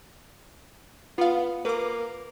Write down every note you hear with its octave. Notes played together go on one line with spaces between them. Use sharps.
B3 F4 F5
A#3 B4 D6